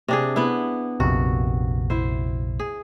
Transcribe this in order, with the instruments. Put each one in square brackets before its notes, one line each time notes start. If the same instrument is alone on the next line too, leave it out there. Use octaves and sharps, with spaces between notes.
[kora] C3 D4 G#4
B3 E4
[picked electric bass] A#1 F2 C3 [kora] F#4
[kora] E4 C5
G#4